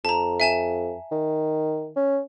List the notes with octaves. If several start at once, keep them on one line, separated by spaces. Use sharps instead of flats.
F2 A5 A#5
E5 G#5 E7
D#3
C#4